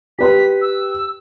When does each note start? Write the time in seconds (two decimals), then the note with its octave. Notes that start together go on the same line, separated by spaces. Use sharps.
0.19 G4 B4 C6 B6
0.62 E6